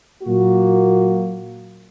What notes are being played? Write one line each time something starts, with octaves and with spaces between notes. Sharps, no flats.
A#2 F#3 A#3 F#4